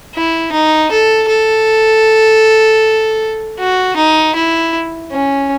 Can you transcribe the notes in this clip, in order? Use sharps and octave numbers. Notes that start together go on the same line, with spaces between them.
E4
D#4
A4
A4
F#4
D#4
E4
C#4